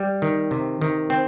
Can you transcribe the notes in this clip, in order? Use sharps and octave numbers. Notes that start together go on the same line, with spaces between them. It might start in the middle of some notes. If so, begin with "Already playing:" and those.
Already playing: G3
D#3
C3
D#3
C4